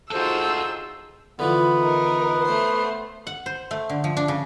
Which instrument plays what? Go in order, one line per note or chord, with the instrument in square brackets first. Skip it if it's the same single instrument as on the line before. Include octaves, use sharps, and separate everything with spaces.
[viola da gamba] D#4 F4 G#4 [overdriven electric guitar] F#4 A4 [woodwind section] C5 [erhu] E6
[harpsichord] D3 E3 F3 [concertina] B3
[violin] D#4 A#4
A3 C5
[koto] F#5
C5
A3
D3
F3
D4
C#3